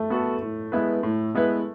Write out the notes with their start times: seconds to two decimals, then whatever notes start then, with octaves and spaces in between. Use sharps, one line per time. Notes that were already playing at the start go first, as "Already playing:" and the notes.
Already playing: A3
0.10 B3 F#4 A4
0.42 A2
0.72 G#3 B3 E4 B4
1.03 A2
1.35 G#3 B3 E4 B4